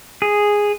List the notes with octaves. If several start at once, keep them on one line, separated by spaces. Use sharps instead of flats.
G#4